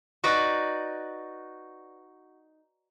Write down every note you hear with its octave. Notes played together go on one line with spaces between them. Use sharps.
D#4 F#4 B4 D5